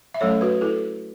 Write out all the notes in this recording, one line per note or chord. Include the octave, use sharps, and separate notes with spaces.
E5
F#3 A3 C#4 A4 C#5
F#4 B4
E4 A4